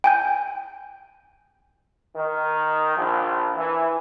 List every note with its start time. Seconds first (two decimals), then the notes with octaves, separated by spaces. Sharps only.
0.04 G5 G#5 G6
2.16 D#3
2.95 A#1
3.55 E3